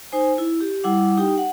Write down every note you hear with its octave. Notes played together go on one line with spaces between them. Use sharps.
D#4 C5 G#5
E4
G4
G3 E4 F#5 D6
D#4 G4 G5
F#5